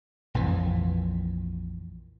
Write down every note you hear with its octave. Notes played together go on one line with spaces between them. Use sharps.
A#1 F2 E3